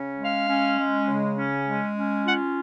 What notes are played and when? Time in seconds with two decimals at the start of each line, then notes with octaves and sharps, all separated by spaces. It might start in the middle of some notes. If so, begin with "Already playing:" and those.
Already playing: C#3 C#4
0.17 G#3
0.24 F5
0.47 C#4
0.77 G#3
1.06 C#3
1.36 C#4
1.66 G#3
1.96 C#4
2.25 F4 F#5